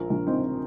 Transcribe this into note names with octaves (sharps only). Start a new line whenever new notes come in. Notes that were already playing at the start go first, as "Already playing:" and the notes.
Already playing: A#1 F3 A#4
A#1
F3 C4 D#4